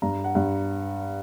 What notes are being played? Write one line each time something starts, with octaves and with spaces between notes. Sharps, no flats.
G2 A#5
F#5
G2